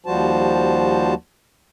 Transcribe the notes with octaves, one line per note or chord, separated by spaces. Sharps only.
D#2 F3 G3 F#4 C5 A5